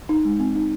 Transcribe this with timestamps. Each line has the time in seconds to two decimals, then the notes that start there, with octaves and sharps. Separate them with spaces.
0.09 D#4
0.25 G#3
0.40 C4
0.55 D#4